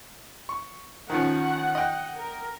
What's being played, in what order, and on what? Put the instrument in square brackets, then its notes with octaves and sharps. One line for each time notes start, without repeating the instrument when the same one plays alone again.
[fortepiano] C#6
[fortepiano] D#3 F3 C#4 [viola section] F#5
[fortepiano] D#5 G5
[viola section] A#4